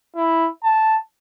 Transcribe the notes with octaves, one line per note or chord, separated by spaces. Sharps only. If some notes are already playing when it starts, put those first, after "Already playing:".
E4
A5